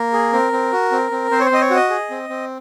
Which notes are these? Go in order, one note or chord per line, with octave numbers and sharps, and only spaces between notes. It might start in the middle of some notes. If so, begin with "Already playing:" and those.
Already playing: A#3 A#4
G#4
C4
C4
F#4
C4
C4
C4 C5
C#5
C5
C4 D#5
C#5
F#4 D#5
G#4
C4
C4